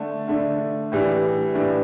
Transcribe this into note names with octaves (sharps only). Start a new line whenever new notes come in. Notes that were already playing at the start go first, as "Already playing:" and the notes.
Already playing: D3 A3 D4
D3 A3 D4
A2 E3 G3 D4
A2 E3 G3 D4